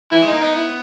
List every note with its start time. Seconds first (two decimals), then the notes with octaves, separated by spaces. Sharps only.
0.12 E3 E4
0.22 G#3
0.27 A#3 D#4
0.41 B3 D#4
0.55 E4